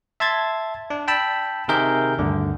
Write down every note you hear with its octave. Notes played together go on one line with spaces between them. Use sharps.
E5 A5 C6 G#6 A6
D4
G5 A5 B5 E6
C3 D#3 G#4 A#4 E5 G6
D2 G2 D3